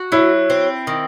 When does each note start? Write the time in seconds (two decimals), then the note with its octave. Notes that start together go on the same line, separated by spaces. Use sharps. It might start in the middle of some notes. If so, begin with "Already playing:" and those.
Already playing: F#4
0.12 F#3 E4
0.50 C4
0.87 D#3